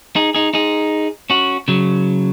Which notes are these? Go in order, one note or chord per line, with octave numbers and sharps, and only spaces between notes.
D#4 G#4
D#4 G#4
D#4 G#4
C#4 F#4
C#3 F#3